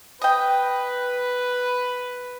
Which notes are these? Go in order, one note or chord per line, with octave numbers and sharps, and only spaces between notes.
B4 D#5 G5